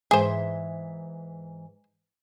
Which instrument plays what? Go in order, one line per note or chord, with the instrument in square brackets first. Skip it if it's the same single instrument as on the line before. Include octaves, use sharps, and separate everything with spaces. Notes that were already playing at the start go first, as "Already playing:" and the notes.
[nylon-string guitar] G#2 E3 E5 [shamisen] G#4 C5